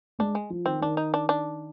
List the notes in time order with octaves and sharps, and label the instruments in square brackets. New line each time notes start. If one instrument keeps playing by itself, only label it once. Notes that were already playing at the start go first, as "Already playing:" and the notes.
[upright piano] G#3 [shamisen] D4
[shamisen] G#3
[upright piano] F3
[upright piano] D#3 [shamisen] C4
[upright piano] D#3 [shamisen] D4
[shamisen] D#4
D4
D4